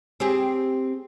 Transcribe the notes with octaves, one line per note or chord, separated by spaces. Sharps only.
C4 G4 G#4